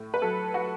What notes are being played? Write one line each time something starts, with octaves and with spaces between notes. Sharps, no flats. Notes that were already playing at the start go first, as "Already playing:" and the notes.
Already playing: A2
B4
F#3 A4
F#3 F#4